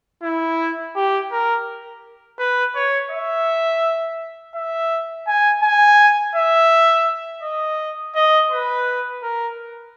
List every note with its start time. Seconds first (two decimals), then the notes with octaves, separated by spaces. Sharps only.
0.23 E4
0.96 G4
1.32 A#4
2.39 B4
2.76 C#5
3.11 E5
4.55 E5
5.27 G#5
5.63 G#5
6.36 E5
7.42 D#5
8.15 D#5
8.51 B4
9.23 A#4